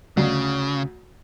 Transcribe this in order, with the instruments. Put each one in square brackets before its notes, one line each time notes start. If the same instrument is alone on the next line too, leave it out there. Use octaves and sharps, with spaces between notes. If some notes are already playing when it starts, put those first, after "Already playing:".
[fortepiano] D2 [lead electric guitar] C#3